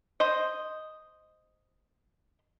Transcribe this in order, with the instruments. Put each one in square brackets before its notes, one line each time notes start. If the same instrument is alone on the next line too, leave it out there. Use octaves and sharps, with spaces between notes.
[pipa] C5 D#5